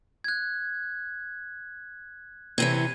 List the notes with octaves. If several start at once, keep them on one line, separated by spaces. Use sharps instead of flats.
F#6 G#6
C3 E3 C#4 G#6 D#7